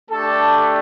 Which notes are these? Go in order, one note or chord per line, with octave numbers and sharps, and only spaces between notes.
A3 D4 G4 A4